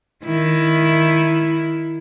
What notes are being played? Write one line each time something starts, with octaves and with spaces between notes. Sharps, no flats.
D#3 E4